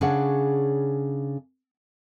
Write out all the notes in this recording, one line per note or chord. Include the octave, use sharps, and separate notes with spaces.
C#3 D4 G#4 C#5 F#5